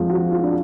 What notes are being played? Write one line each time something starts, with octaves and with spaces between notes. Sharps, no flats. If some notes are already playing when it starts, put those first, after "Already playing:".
Already playing: F2 F3 G#3 F4
F#4
F4
D4